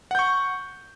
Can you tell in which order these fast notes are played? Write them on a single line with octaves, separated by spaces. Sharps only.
F#5 G6 C#6